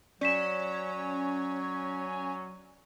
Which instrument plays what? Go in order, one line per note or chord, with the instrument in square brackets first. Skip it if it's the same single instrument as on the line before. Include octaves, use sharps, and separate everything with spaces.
[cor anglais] F#3 [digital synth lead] C#4 [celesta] D5 B6 E7